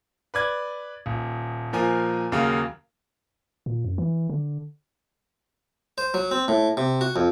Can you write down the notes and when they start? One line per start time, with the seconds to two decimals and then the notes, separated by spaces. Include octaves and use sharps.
0.34 B4 D5 G#6
1.06 D#1
1.73 A#2 F3 A#4 G#5
2.32 D#2 C#3 F#3 A#3
3.66 A#2
3.84 F#2
3.98 E3
4.30 D3
5.98 C5
6.14 F#3
6.31 C4
6.48 A2
6.77 C3
7.01 F#4
7.16 F2